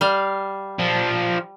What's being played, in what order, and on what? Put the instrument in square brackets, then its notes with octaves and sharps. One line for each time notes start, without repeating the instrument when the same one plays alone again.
[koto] G3 F5
[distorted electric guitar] F3 D4